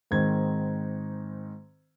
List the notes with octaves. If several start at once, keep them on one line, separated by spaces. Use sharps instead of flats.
G#2 D#3 C4 D#4 G#6